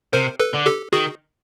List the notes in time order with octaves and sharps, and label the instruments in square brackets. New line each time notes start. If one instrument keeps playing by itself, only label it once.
[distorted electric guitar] C3 [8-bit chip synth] A#4 C5
[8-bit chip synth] A4 B4
[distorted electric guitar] D3
[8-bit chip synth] G4 A4
[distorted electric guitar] D#3 [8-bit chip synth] F#4 G#4